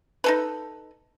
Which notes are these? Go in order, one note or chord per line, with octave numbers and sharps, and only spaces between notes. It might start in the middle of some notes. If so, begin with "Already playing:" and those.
D#4 A4 B4